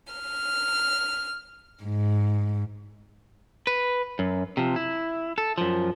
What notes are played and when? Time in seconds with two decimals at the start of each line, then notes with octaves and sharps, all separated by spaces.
0.13 F6
1.82 G#2
3.67 B4
4.19 F#2
4.57 C3 F3
4.76 E4
5.38 A4
5.58 F#2 F3